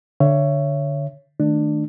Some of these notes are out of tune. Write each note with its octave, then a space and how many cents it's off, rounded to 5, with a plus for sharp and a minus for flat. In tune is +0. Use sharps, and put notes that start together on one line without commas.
D3 +0 C#5 +5 E5 +30
D#3 +0 A3 +0 D4 +20